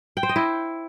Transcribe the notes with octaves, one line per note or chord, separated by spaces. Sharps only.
G5
C5
D#5
E4